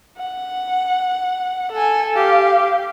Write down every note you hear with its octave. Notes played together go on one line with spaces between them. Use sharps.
F#5
A4 G#5
G4 F5